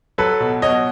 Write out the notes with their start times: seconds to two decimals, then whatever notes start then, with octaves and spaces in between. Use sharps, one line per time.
0.18 F#3 A4 B4
0.40 B2
0.62 B2 C#5 D#5